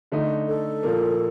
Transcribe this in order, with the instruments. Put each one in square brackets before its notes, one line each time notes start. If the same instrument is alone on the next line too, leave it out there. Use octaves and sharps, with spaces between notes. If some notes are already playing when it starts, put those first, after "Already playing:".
[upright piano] D3 A3 D#4
[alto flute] A4
[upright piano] A#2 F3 A#3